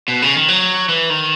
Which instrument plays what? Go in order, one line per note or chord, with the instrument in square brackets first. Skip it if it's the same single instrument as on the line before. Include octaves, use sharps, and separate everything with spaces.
[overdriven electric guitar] B2
C#3
D#3
F#3
E3
D#3